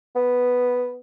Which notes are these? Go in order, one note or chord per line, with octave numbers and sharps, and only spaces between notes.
B3